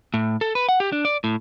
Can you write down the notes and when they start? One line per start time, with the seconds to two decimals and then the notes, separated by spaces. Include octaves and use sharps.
0.14 A2
0.41 A4
0.55 B4
0.69 F#5
0.80 G4
0.92 D4
1.05 D5
1.24 A2